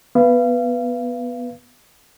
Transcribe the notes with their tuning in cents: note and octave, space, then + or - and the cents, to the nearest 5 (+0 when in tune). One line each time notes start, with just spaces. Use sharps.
B3 +0 F5 -30